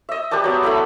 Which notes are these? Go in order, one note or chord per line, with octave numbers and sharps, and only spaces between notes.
D#5 E5
G4 B4 D5 A5
F#3 B3
A3 E4 B5